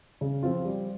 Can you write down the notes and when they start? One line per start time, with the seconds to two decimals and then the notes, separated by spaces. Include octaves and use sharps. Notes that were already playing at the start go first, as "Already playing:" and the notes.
0.21 C#3
0.43 F3 C4 F4
0.65 G3